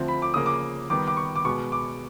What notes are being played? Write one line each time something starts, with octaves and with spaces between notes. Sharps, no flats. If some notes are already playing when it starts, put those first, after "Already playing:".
Already playing: D3 F3 A3 C4
B5
D6
C#3 F3 A#3 D#6
D6
D#3 G3 B3 D6
D6
C#6
D6
B2 G#3 B3 C#6
D6